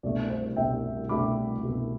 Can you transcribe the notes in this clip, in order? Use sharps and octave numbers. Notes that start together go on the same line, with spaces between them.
C2 B2 A3 D4 D5
C5
C2 B2 A3 D4 E5 G5
C2 B2 A3 D4 B5 D6
C2 B2 A3 D4